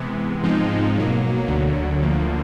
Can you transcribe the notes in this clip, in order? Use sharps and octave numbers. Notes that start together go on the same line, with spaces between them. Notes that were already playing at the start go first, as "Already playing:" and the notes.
Already playing: C3 E3 G#3 B3
G#2 F3 G#3 C4 D#4
B2 F#3 A#3
D2 D3 F#3
D2 D3 F3 A#3